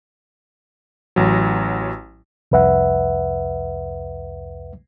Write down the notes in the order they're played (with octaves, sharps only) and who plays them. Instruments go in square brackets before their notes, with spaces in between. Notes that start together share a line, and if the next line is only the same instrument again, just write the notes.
[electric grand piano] A1 F#3
[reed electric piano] C2 F2 B4 E5 F#5